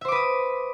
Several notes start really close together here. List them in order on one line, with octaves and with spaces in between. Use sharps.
E5 C5 D6 B4 D#6